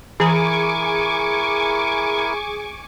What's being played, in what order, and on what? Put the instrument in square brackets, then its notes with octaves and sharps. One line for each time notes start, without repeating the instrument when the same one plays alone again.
[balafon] E3 A#5 [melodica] E4 A#4 [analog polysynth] G#4 [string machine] G#5 C#6 D6